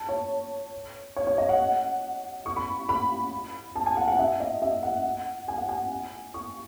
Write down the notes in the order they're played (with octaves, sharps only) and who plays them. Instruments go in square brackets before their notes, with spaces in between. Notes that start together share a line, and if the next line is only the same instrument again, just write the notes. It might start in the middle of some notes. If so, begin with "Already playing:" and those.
Already playing: [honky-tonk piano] A5
C#5
C#5
C#5
D#5
F#5
C#6
B5
B5
A5
G#5
F#5
F#5
E5
D#5
E5
F#5
G#5
F#5
G#5
C#6